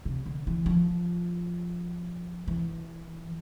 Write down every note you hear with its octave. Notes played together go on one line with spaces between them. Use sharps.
C3
D3
E3
F3
E3